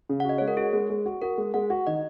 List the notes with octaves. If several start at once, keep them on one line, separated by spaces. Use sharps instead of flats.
C#3
F#5
F#4 D#5
G#3 C#5
A#4
F#4 G#4
G#3
G#3
F#4
F#4 A#4
G#3
G#3 F#5
F#4
D#3 D#5